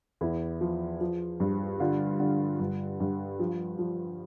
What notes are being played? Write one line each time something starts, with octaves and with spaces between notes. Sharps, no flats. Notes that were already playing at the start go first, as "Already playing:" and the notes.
E2 E4
F3
F3
G2
D3 F4
D3
G2
G2
F3
F3